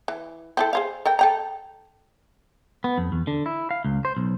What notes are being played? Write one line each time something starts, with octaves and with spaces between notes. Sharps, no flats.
E3
C4 E4 A4
G#4 C5 F5
A4 A#4 G5
A4 G5 A#5
B3
F2
E2
D3
E4
F5
C#2
C5
B1